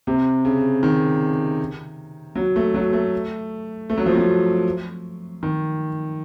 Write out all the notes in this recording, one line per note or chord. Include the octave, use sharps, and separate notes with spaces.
C3
C#3
D#3
F#3
A3
F#3
A3
A3
F#3
F3
F#3
D#3